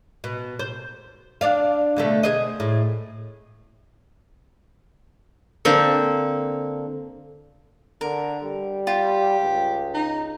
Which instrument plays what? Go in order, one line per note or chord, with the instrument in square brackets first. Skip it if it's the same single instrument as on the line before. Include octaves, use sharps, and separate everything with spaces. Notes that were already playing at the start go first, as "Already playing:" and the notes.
[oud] B2
C5
D4 D5 F5
B2 D3 A3
G#4 C5 D#5
A2
[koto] D3 A#3 C4
[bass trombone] D3 [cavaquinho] A#4
[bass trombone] G3
[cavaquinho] F4 [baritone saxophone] G4
[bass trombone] C#2
[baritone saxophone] D#4